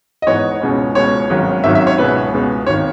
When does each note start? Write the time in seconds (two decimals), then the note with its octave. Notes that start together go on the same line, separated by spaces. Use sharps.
0.22 D#5
0.27 G#2 E3 B3 C#5
0.61 C#2 B2 G#3 C#4
0.95 C#2 B2 G#3 C#4 C#5
1.30 G#1 G#2 D#3 F#3 C#4
1.64 G#1 G#2 D#3 F#3 C#4 E5
1.75 E5
1.87 C#5
1.98 C#2 B2 G#3 B3 B4
2.33 C#2 B2 G#3 B3
2.67 G#1 D#3 C#5